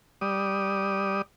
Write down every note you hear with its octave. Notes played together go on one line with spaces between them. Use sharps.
G3 D5 D#6